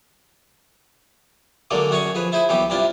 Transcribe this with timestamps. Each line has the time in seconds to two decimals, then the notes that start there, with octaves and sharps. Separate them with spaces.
1.71 D3 F#3 G#3 A#3 D4
1.91 F#2 F#4 G#4 C#5 G#5 C#6
2.15 F3 G#4 B4
2.32 E4 G#4 C5 B5 D#6
2.49 C2 E3 F#3 B3 G4
2.70 G2 C3 D4 E4 F4